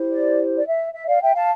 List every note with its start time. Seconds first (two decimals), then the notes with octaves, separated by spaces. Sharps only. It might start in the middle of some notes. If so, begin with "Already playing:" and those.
Already playing: E4 G4 C5
0.11 D5
0.56 D5
0.67 E5
0.94 E5
1.08 D5 F5
1.22 E5 G5
1.36 F5 A5